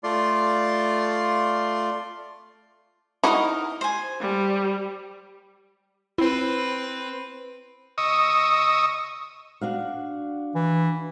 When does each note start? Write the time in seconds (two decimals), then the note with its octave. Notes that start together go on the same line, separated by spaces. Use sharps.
0.04 A3 F4 D5 C6
3.24 D#4 E4 F#4 A#4 D#6
3.81 C5 G#5
4.21 G3
6.18 C4 E4 B4
7.98 D#5 C#6 D#6 E6
9.61 D4 F#4 F5
10.55 E3